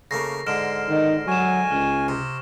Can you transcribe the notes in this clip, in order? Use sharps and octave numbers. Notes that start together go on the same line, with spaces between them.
C#3 A3 A#3 A#6 C7
G#2 D3 F6 D7 E7
D#3
F#3 G#5 C#6 E7
C#2 F6
C3